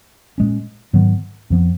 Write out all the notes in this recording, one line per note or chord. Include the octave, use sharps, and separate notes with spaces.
A#2 G#3 C#4
G#2 D#3 F#3 B3
F2 F3 B3